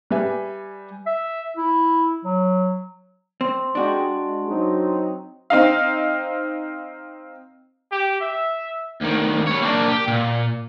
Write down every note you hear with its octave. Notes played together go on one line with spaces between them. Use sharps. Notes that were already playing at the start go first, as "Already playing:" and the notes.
G3 G4 B4 E5 G#5
E5
E4
F#3
C4 C6
G#3 D4 F#4 G4
G#3
F#3 C4 D#4
C4 D#4 F5
G4
E5
D2 D#3
G3 C#5
A#3 D4
G4
A#2